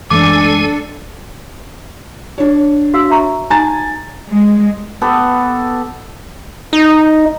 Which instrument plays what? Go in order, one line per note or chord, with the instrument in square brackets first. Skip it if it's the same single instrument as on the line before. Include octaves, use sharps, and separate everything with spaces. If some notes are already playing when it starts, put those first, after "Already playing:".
[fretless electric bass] F#2 E3 A3 [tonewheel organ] G#3 G#5 [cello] D4 A4 [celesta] D6
[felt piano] D4 C#5
[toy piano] F#4 F5 E6
E5 A#5 C#6
[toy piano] D#4 A#5 [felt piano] G#5 A6
[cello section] G#3
[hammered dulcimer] B3 G4 A4
[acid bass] D#4